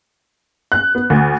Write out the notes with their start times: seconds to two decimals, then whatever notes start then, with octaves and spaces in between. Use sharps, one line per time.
0.72 F#6
0.95 B3
1.10 D2